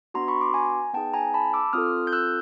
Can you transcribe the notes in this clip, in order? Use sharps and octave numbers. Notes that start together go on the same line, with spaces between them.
B3 D4 F#4 A#5 C6
B5 C#6
C6 D6
G#5 A#5
B3 D#4 G#4 G5 A5
G#5 A#5
A5 B5
D6 E6
C4 F4 A4 D#6 F6
G6
E6 F#6